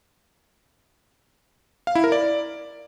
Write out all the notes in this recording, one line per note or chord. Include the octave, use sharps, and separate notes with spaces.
F5
E4
A#4
D5